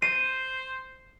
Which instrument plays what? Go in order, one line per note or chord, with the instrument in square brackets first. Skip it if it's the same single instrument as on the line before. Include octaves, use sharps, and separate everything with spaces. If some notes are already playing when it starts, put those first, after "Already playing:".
[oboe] C5 [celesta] C7 [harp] D#7